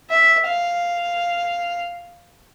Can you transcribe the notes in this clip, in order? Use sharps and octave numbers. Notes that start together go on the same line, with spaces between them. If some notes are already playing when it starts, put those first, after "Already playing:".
E5
F5